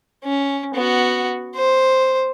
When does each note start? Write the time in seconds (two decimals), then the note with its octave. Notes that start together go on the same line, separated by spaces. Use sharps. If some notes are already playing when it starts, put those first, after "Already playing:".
0.24 C#4
0.75 B3 F#4
1.55 C5